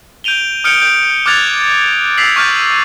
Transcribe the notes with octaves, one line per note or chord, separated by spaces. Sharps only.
G6 D7 D#7 F7 G7
D#6 F6 G6 C#7 D7 G7
G6 D7
D6 F6 F#6 G#6 A6 F7
E6 A6 B6 C7 F7 F#7
C#6 D6 F6 G6 A6 D#7